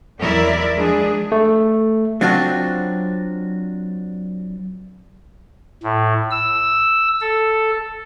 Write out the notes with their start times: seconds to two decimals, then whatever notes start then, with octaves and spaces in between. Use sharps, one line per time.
0.21 E2 F#3 E4 A#4 D5 E5
0.75 F3 G#3 D4 G#4
1.32 A3
2.21 F#3 C4 D4 F4 F#4
5.83 A2
6.31 E6
7.21 A4